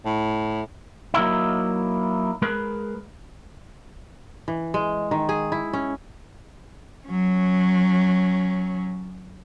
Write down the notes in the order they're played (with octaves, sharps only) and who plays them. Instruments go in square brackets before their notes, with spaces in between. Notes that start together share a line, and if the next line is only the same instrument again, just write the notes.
[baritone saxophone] A2
[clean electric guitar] F#3 A#3 D#4 E4
G#3 G#4 A#4 B4
[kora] E3
G#3
D#3
G#4
E4
C#4
[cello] F#3 C#4